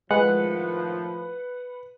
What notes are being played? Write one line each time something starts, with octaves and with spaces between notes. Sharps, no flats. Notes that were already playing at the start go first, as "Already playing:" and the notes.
A2 D#3 F3 G#3 B4 F#5